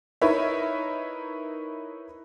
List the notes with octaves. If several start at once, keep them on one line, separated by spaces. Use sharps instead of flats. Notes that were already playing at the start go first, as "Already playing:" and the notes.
D#4 E4 A#4 B4 C#5 E5